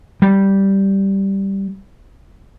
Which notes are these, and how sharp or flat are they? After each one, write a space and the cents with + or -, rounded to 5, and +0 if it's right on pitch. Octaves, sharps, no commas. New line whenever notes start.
G3 -5